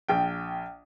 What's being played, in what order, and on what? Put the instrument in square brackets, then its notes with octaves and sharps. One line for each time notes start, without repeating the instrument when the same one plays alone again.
[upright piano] A#1 G5